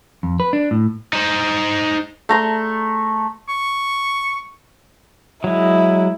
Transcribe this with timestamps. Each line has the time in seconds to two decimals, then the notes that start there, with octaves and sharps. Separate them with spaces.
0.23 F2
0.40 B4
0.53 D4
0.71 A2
1.13 D#4 C5
2.29 A3 A#5 C6
3.48 C#6
5.44 F#3 G#3 E4